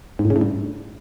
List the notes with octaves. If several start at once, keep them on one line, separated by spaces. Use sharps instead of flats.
G#2
A2
C#3
A2
G2